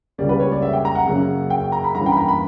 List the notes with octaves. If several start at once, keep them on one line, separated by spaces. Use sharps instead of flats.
C#2 C#3 G3 A#3 C#4 D5
B4
C#5
D5
E5
G5
A#5
F#5
F#2 C#3 F#3 A#3 C#4
G5
A#5
B5
G2 E3 A#3 C#4 A#5
G5
B5
A#5
B5